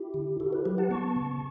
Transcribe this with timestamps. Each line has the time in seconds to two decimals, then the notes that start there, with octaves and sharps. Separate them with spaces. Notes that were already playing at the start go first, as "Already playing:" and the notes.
Already playing: E4 G4
0.14 D3
0.40 E4 F#4 A4
0.53 G4 B4
0.65 F#3 G4 B4
0.78 F#5 A5
0.90 B3 A5 C#6
1.16 C#3